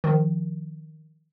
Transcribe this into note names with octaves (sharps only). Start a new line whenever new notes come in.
D#3 F3